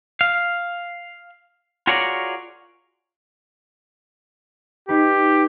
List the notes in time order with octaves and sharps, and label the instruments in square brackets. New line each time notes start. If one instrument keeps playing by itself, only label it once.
[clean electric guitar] F5
F4 F#4 G#4 A#4 C#5 D5
[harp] D#4 B4 [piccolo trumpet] G4